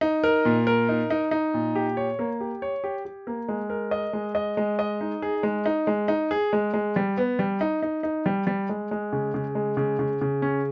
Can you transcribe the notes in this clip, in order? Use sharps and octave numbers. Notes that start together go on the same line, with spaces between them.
D#4
A#4
A#2
A#4
D#4
D#4
D#4
A#2
G4
C#5
A#3
G4
C#5
G4
G4
A#3
G#3
A#4
D#5
G#3
D#5
G#3
D#5
D#4
G#4
G#3
D#4
G#3
D#4
G#4
G#3
G#3
G3
B3
G3
D#4
D#4
D#4
G3
G3
G#3
G#3
C#3
C#3
G#3
C#3
C#3
C#3
C#4